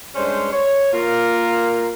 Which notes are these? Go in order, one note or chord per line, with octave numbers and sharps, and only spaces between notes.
G2 G#3 C#4 D4 C5
C#5
A#3 F4 A#4